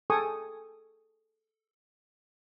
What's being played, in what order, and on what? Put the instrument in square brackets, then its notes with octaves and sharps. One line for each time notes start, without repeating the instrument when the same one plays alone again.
[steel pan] G#4 A4 G5 G#5 C#6 D#6